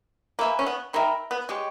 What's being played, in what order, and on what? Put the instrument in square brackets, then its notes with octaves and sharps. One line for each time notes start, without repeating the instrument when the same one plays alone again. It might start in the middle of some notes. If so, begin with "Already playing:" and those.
[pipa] A#3 [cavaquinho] B4 E5 G#5
[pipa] C#4
B3
[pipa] D#3 [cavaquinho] A#4 E5 G5 B5
[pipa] B3
[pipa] G#3 [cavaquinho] G4 C#5 G5 C#6